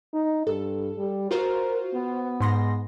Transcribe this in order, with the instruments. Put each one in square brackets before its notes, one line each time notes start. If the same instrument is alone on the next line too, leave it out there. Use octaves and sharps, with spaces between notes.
[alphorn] D#4
[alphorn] G2 [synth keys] A4
[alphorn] G3
[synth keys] F4 F#4 C5 [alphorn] A#4
[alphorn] B3
[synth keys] G#2 C6 A#6